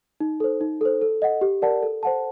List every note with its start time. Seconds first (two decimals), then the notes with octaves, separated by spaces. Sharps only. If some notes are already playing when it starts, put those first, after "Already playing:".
0.20 D#4
0.40 A4 C5
0.61 D#4
0.81 A4 C5
1.01 A4
1.22 D#5 F#5
1.41 G4
1.62 A#4 D5 F#5 A5
1.83 A4
2.03 C5 F#5 A5